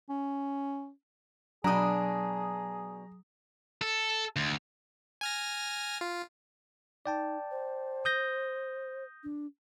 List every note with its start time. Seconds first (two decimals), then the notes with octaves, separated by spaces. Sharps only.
0.09 C#4
1.64 B2 F#3 D4 G#4 A#5 D#6
3.81 A4
4.36 D2
5.21 G#5 F6 A#6
6.01 F4
7.06 D#4 D5 G5 A5
7.51 C5
8.05 D#6 G6 A#6
9.23 D4